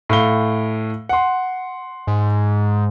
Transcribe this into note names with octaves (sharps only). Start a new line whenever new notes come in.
A2 F5 G7
F#5 C6
G#2